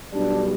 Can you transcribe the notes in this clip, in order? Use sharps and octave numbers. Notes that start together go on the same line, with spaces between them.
B1 B2 G3 D4